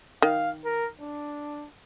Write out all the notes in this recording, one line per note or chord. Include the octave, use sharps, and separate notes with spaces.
D#3 F5
A#4
D4